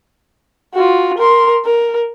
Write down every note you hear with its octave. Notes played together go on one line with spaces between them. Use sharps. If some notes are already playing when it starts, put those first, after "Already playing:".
F4 F#4
A#4 C6
A#4